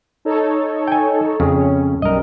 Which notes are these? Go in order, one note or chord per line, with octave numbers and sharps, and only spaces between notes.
D#4 A4 C#5
G5 G#5
F2 C#3 G#4
C#4
B1 F#2 G3 A#4 D#5